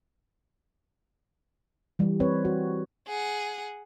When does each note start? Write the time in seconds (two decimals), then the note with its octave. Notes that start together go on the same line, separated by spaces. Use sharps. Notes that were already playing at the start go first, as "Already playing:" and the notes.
1.99 E3 G3
2.20 C4 B4 C#5
2.45 F#4
3.07 G#4 F#5